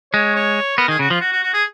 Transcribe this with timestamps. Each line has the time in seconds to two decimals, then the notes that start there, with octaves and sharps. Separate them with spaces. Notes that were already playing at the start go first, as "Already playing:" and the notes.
0.13 G#3 C#5
0.35 C#5
0.78 B3 A#4
0.88 D#3 G#4
0.99 C#3 F#4
1.10 F3 F4
1.21 F#4
1.32 F#4
1.43 F#4
1.54 G#4